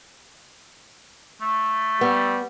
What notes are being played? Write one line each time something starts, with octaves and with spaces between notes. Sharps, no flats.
A3
G3 B3